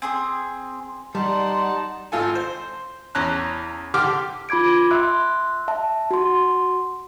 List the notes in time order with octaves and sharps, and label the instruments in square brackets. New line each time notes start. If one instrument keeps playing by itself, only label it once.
[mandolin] C4 G#4 D#6
[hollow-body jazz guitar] G3 [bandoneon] D#4 A5 [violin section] D5 F#5 [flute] C6
[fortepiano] G#1 F4 A4 G#5
C5
E2 C#4 A5 A#5 F#6
D3 G4 C6 D6 F6
[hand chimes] F4 B5 D6 G#6 D7
E5 C6 E6 F#6
E5 A5
F#4 C6